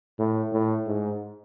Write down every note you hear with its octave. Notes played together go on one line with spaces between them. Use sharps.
A2
A2
G#2